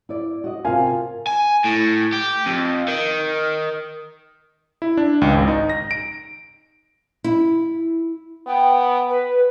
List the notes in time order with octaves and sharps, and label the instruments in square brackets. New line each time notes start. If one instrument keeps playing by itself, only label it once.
[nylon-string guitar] E4 D5
F#4 D#5
[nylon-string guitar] C3 A#4 [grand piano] F4 F5 G#5
[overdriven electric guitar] G#5
A2
G4
F2
D#3
[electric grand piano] E4
D4
C#2
G#1
D#4
A#6
D7
[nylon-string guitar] E4
[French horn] B3 [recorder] G5
[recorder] B4